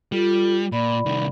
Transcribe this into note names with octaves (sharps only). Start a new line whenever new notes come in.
G3 F4 A4
A#2 D5 B5
C2 D#3